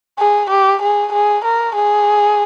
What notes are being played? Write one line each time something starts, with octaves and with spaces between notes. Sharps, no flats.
G#4
G4
G#4
G#4
A#4
G#4